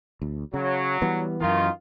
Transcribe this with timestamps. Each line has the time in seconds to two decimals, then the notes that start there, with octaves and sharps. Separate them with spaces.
0.22 D2
0.54 C#3 F#3
1.02 E3 G3 B3
1.41 F#2 D#3 E3 F4